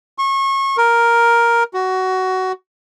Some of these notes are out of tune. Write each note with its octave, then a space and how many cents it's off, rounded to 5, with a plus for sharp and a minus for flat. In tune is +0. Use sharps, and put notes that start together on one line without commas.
C#6 -30
A#4 +5
F#4 +15